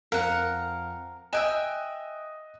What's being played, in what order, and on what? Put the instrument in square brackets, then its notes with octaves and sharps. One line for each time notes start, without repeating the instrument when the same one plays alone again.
[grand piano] F2 F5 F6 [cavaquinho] A#4 F#5
[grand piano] D#5 F#6 E7 [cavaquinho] E5 G5 G#5